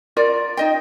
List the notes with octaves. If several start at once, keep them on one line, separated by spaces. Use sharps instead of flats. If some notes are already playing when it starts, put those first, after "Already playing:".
F4 A#4 D5
D#4 D#5 G5